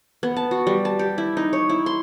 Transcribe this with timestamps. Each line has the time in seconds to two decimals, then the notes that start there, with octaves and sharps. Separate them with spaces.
0.23 B3
0.37 A5
0.51 F#4
0.67 G3
0.85 A5
0.99 G4
1.18 E4
1.37 D#4
1.53 C#5
1.70 E4
1.86 C6